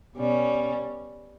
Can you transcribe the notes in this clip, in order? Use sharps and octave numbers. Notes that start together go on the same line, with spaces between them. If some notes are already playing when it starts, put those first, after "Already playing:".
B2 G3 C#4